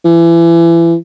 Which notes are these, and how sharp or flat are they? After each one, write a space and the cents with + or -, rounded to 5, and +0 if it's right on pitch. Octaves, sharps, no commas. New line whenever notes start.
E3 +30